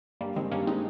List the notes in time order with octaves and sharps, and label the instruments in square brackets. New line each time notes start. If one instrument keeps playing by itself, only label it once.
[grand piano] G2 [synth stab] G3 A#3
[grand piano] D#3 [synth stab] G#3 C4
[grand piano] G2 [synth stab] A#3 C#4
[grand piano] G#3 [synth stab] C4 D#4